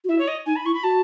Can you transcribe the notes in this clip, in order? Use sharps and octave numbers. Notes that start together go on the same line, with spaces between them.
F#4
E4 E5
C#5
D#5
D#4 G#5
B5
E4 C#6
B5
F#4 A5